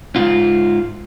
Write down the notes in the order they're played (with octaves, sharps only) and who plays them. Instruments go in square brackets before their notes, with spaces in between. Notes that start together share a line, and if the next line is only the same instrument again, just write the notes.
[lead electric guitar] G#2 F4